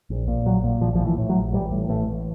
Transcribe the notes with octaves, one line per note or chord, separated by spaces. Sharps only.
A#1
A#2
A#1 F#3
A#2
A#1 F3
A2 F3
E3
A2
F#3
A#1
A1 G3
A2
A1 A3
A1